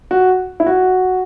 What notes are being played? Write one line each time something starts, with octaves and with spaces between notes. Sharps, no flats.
F#4
E4
F#4